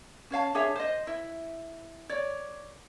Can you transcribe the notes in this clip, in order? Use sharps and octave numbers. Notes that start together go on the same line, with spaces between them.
C#4 C#5 F5 A5
D4 G#4 C#5 E5
C5 D#5
E4 E5
C#5 D5